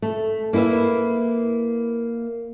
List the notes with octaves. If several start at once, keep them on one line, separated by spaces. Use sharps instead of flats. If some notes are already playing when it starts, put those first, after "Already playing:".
A3
A#3 E4 G#4 B4 E5